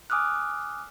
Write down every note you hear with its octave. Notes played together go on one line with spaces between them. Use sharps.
G#5 D6 D#6 F6 F#6